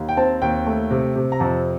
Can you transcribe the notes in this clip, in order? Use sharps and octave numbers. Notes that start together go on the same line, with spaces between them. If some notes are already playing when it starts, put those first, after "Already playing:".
Already playing: D#2
G5
C4 A5
D#2 G5
A3
C3
C3
A#5
F2 A5